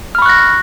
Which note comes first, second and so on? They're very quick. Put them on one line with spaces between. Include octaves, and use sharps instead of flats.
F6 B5 C#6 F#6 A#6